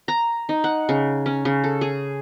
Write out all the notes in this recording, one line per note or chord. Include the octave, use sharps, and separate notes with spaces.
A#5
D#4
F#5
C#3
C#4
C#3
A4
G#4